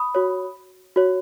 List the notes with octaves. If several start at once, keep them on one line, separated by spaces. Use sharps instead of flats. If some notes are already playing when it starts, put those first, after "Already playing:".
Already playing: B5 D#6
F#4 C#5
F#4 C#5